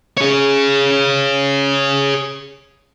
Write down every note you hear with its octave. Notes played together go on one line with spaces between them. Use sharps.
G#4 C#5